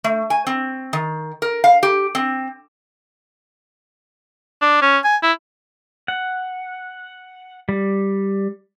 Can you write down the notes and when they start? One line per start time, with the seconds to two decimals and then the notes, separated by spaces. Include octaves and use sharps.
0.04 A3
0.30 G#5
0.47 C4
0.93 D#3
1.42 A#4
1.64 F5
1.83 G4
2.15 C4
4.62 D4
4.82 C#4
5.04 G#5
5.23 E4
6.08 F#5
7.69 G3